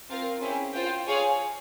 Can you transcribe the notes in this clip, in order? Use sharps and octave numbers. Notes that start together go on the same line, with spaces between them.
C4 F4 A#4 F5
C#4 E4 G#4 C5 G5
F4 C5 G5
G#4 C#5 F5 G#5